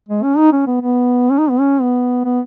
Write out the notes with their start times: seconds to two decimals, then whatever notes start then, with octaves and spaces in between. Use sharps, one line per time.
0.09 G#3
0.23 C#4
0.37 D#4
0.53 C#4
0.67 B3
0.81 B3
1.30 C#4
1.39 D#4
1.50 B3
1.60 C#4
1.82 B3
2.25 B3